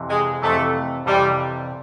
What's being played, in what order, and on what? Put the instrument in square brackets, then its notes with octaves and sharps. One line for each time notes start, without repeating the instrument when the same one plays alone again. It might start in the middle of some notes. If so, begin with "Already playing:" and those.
Already playing: [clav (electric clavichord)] F2 C3 E3
[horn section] G#3
[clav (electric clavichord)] F2 C3 E3 [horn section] A3
[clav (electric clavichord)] F2 C3 E3 [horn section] G3